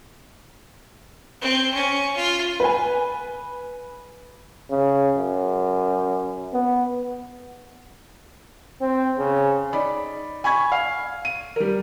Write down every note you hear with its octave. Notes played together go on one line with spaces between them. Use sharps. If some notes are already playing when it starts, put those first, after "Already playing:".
C4
C#4
F4
B4 G#5
C#3
F#2
B3
C4
C#3
D#4 D5 B5
G#5 B5 C#6 G#6
F5
D#7
G3 A#4